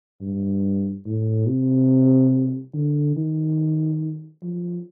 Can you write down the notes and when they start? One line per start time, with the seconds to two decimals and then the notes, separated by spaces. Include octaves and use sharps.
0.21 G2
1.06 A2
1.47 C3
2.74 D3
3.16 D#3
4.43 F3